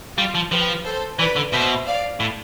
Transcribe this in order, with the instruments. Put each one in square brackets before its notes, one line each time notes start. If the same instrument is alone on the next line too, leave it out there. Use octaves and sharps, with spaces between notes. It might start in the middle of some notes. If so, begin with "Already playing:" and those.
[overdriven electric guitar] G3 [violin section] F4
[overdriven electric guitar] F3
[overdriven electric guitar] F3 [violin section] G4 B4
[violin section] A4 C5
[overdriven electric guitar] E3 [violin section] B4 D5
[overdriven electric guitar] D3
[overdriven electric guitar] B2 [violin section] C5 E5
[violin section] D5 F5
[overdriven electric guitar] A2